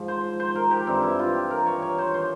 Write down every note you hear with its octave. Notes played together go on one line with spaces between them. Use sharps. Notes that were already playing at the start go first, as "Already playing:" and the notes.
Already playing: G#2 F3
C5
C5
A#4
G4
G2 E3 C4
E4
F4
G4
A#4
C#5
C#5
C5
E3 C5